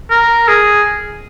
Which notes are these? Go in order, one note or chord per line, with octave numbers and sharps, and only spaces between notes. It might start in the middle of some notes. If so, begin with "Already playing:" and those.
A#4
G#4